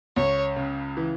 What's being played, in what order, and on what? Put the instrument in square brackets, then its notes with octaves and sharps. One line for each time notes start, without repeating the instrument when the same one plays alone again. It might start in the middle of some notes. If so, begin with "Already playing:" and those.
[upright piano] C#2 [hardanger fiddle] C#5
[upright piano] C#3
E3